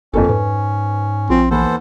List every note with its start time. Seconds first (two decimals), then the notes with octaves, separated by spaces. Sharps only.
0.13 F#1 F2 A#3 C#4 A4
0.29 G#2 B4
1.30 A#1 F3 C4
1.51 D#2 E3 B3 A4 C5